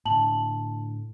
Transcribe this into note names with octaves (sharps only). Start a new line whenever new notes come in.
A2 D3 A5 F#7